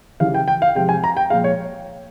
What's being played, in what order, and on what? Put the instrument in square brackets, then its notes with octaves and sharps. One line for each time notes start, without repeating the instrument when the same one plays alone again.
[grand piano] C#3 E3 G3 F5
G5
G5
F5
C3 F3 G#3 G5
G#5
A#5
G5
A#2 F3 G#3 F5
C#5